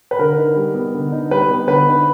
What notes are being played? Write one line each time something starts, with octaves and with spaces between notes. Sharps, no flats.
B4
D3 A#4
D#4
G3
B3
D3
D#4
G3 B4
B3
D3 B4
D#4